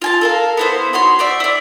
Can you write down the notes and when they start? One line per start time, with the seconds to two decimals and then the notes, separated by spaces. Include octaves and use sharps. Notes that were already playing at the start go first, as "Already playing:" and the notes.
0.02 F4 G#5 A5
0.21 A4 A#4 F5
0.57 B3 E4 C5
0.93 D#4 F#4 C#5 C6
1.19 C5 D5 E5
1.40 E4 D5